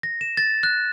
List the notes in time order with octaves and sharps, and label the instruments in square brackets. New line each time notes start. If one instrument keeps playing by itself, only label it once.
[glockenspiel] A#6
E7
A6
F#6